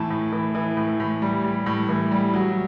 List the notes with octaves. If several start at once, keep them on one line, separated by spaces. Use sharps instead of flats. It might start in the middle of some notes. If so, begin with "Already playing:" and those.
Already playing: A2 E3 A5
A2
E3
E3
A2
A2
G3
G3
A2
E3
G3
F#3